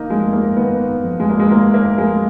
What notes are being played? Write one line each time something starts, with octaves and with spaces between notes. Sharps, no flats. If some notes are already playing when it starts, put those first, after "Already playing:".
Already playing: D#3 A#3 D#4
F2 G#3
A#3
D#3 B3
F2
G#3
A#3
G#3
D#3 A#3
A#3
F2 G#3